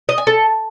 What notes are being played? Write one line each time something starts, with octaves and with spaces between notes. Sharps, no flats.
D#5
G#5
A4